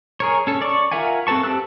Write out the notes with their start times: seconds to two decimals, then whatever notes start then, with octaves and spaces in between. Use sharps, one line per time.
0.20 G#4 A#4 C#5
0.47 C#4 A4
0.62 D5 C#6
0.92 F4 A#4 E5 F#5 G#5
1.27 C4 A4 B4 A5 C#6
1.43 C4 G4 A5 E6 F#6